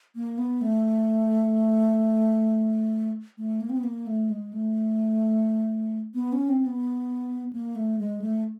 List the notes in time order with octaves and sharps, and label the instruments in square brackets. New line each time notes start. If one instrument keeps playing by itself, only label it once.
[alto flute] A#3
B3
A3
A3
A#3
C4
B3
A#3
A3
G#3
A3
B3
C#4
C4
B3
A#3
A3
G#3
A3